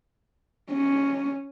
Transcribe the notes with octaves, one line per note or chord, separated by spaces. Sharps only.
C#4